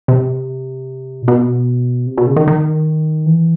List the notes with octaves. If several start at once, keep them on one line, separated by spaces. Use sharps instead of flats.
C3
A#2
B2
C3
B2
C#3
D#3
D#3
E3